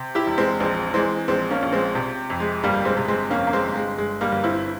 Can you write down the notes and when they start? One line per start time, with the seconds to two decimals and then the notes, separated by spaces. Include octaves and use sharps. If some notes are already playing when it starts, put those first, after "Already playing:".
Already playing: C3
0.15 E4 G4
0.27 E1
0.38 G#3 C4
0.60 A#1 G#3 C4
0.94 E3 G#3 C4
1.28 A#1 G#3 C4
1.51 A#3 C#4
1.62 A#1
1.73 G#3 C4
1.95 C3
2.30 F2
2.40 G#3
2.63 G1 G3 A#3
2.85 G#3 C4
2.97 C3
3.08 G#3 C4
3.30 F2 A#3 C#4
3.47 A#3
3.53 G#3 C4
3.65 G1
3.76 G#3
3.98 G1 G#3
4.21 G3 A#3
4.32 G1
4.44 C4 E4